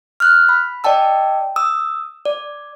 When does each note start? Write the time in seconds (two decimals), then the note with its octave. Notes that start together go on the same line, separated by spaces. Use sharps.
0.20 F6 F#6
0.49 B5
0.84 D5 D#5 G5 A5 E6
1.56 D#6 E6
2.25 D5